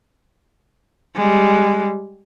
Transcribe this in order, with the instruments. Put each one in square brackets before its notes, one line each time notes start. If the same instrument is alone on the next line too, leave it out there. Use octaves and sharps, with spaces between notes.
[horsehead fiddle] G3 G#3